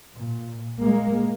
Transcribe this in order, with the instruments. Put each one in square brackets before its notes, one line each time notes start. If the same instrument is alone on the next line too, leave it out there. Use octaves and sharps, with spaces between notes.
[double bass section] A#2
G#3 A#3